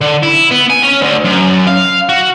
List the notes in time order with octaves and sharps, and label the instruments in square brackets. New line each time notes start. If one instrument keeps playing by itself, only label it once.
[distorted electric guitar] D3
E4
B3
G#5
C#4
D2
F#2
F5
F#4